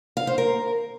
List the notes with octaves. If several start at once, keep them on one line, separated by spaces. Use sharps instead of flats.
F5
C5
A#4